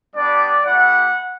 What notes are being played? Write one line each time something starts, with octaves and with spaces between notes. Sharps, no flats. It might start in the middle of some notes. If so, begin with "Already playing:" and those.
G3 B3 D4 D5
A3 E4 G4 F#5